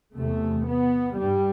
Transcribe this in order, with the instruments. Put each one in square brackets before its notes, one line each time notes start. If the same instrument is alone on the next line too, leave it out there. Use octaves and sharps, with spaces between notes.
[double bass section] E2 C3 A3
B3
G2 G3